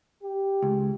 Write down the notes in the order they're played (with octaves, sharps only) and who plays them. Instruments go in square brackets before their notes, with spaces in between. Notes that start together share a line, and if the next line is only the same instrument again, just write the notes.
[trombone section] G4
[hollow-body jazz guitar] C#2